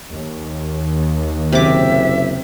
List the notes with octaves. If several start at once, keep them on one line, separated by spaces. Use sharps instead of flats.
D#2
F#1 C3 E5 D6